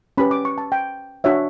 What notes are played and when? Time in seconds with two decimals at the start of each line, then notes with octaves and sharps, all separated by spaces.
0.18 C#4 G4 B4 B5
0.31 D6
0.45 C#6
0.58 A5
0.72 G5
1.24 D4 F#4 C#5 E5